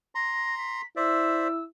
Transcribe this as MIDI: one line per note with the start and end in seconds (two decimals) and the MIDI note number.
0.15 0.81 82
0.15 0.81 84
0.15 0.55 94
0.57 0.85 95
0.96 1.65 64
0.96 1.48 72
0.96 1.48 74
0.96 1.48 76
0.96 1.63 88